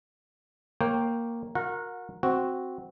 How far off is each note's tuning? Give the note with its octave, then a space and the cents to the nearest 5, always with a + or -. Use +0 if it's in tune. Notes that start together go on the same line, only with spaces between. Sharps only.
A#3 +0 C#5 -25 G5 +0
F#4 -35 A#4 +0 F#5 -30
C4 +0 F#4 +0